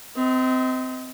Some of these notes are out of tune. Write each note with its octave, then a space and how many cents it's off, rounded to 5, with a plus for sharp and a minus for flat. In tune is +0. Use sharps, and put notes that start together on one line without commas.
C4 -25 D#5 +30